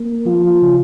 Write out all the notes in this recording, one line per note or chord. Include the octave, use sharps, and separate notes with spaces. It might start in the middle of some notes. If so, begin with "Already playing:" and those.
Already playing: A#3
F3 F4
C#3